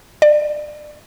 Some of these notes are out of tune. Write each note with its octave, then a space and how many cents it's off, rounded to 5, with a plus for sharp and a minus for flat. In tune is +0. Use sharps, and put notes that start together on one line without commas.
D5 +25